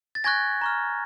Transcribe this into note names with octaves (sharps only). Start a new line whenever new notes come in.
A6
G#5 C#6 F#6 G#6 A#6
A#5 C#6 F6